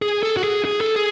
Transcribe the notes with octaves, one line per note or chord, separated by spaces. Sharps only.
G#4
A4
F#4
G#4
G#4
A4
G#4